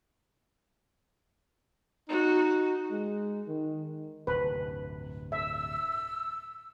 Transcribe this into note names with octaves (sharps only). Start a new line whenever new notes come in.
D#4 F#4
G#3
D#3
D1 G2 C3 B4
E5 E6